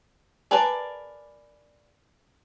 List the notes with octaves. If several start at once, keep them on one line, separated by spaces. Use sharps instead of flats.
G#4 A#4 B4 D5 A5